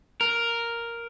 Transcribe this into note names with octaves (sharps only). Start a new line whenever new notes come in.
A#4